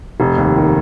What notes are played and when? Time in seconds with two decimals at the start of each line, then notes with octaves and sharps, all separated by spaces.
0.20 F1
0.38 D#2
0.56 D#3